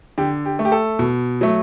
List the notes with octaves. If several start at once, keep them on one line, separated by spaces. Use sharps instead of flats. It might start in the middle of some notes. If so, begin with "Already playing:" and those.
D3 G4
G4
A3
G4
A4
B2
F#3 A3